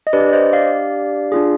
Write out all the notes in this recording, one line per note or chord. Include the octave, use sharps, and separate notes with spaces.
D#5
D4 G4 B4 D5
D5
C5 D#5
D5 F5
D4 F4 G#4